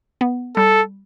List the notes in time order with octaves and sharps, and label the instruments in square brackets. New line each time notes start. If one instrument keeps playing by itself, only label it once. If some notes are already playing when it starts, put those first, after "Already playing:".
[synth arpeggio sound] B3
[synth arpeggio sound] G3 [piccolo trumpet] A4